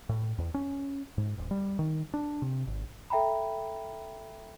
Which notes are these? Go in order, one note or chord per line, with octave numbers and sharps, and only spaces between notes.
A2
E2
C#4
G#2
D#1
G3
D#3
D4
C3
G#1
A4 E5 G5 A#5 B5